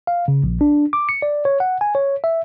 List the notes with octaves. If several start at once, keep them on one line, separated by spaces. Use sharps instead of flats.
F5
C#3
A#1
D4
D6
C#7
D5
C#5
F#5
G#5
C#5
E5